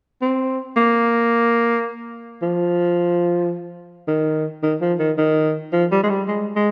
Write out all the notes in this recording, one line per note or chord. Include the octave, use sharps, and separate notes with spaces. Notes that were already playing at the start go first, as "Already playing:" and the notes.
C4
A#3
F3
D#3
D#3
F3
D#3
D#3
F3
G3
G#3
G3
G#3
G#3